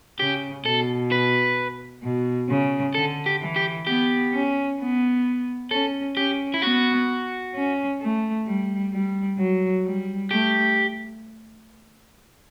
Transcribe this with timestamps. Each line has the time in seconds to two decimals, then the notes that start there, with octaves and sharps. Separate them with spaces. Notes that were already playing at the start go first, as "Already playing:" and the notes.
0.20 C#3 G4
0.65 B2 A4
1.12 B4
2.03 B2
2.49 C#3
2.95 D3 A4
3.26 G4
3.41 E3
3.56 G4
3.87 B3 G4
4.33 C#4
4.79 B3
5.71 C#4 A4
6.17 C#4 G4
6.54 E4
6.62 B3 F#4
7.54 C#4
8.01 A3
8.46 G3
8.92 G3
9.38 F#3
9.85 G3
10.30 A3 G4